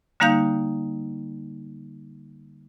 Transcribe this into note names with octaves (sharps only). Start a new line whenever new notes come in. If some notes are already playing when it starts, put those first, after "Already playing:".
D3 G3 A#3 D#4 F5 G6